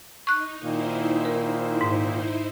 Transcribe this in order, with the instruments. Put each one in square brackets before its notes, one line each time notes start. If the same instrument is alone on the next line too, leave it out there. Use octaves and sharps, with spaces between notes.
[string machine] D#4 [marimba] C#6 F#6
[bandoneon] A#2 D#3 A#3 [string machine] D#4 E4 C5
[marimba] A#4
G#2